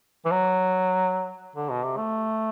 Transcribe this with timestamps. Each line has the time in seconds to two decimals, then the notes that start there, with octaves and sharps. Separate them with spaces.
0.25 E3
0.31 F#3
1.56 D3
1.70 B2
1.83 C3
1.97 A3